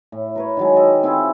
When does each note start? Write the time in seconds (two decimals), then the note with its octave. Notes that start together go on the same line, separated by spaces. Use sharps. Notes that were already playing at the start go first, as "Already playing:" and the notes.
0.12 A2
0.35 A#4 B4 C#5
0.57 D#3 F#3 G#3
0.76 A4 D#5 G5
1.03 C4 E4 F4 G#4